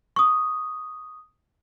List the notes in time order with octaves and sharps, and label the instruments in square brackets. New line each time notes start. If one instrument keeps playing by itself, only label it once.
[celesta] C#6 D#6